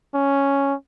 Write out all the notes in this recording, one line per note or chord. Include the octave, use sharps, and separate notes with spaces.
C#4